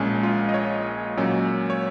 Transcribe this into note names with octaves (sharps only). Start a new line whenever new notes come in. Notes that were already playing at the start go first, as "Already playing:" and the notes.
Already playing: A#1 A#2 G#3 C#4
F4
D#5
C#5
A#2 F#3 C#4
C#5